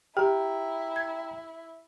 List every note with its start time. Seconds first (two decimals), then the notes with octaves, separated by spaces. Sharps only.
0.17 E4 G4 G5 A#5
0.96 G#6